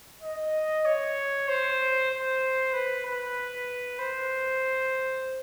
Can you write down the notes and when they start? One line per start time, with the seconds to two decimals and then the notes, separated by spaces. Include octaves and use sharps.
0.22 D#5
0.85 C#5
1.48 C5
2.10 C5
2.73 B4
3.05 B4
3.99 C5